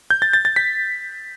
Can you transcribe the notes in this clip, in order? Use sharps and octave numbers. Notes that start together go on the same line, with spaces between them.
G6
A6
A6
A6
B6